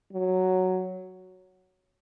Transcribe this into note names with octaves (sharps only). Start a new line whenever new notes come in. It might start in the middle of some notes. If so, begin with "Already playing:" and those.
F#3